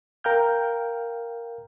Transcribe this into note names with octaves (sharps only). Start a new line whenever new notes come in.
A#4 F5 G5 F6 G6